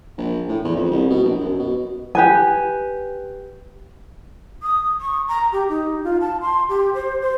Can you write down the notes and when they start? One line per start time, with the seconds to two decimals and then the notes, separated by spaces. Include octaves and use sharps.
0.18 A#1
0.48 A2
0.64 E2
0.76 F2
0.91 C2
1.10 B2
1.24 A#1
1.39 F#2
1.59 B2
2.15 G4 B4 G#5
4.63 D#6
5.01 C#6
5.28 A#5
5.52 G4
5.69 D#4
6.04 F4
6.21 A5
6.41 C6
6.69 G4
6.94 C5
7.22 C5